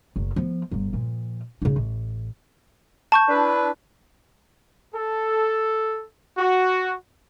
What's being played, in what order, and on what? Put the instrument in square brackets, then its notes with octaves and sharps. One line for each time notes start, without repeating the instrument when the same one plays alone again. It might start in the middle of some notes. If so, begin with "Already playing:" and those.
[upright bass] F#1 C#3
F3 B3
G1 G2
A#2 F3
C#3 D#4
A1
[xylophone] A5 C#6 G6
[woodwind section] D4 E4 B4
[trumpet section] A4
F#4